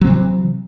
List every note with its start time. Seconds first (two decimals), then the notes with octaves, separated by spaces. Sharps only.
0.01 F#3
0.04 C4
0.07 C3
0.10 E3